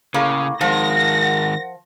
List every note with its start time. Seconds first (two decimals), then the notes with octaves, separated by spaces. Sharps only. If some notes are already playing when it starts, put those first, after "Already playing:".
0.14 A2 C#3 A#3 G#4
0.61 D#3 F3 G#3 A#4 F#5 A#6